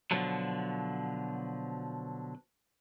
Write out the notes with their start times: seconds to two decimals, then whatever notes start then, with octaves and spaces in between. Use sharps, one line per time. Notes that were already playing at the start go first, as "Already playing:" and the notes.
0.11 B2 D3 F3 F#3